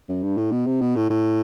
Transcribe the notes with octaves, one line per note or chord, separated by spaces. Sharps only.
F#2
G2
A2
B2
C3
B2
A2
A2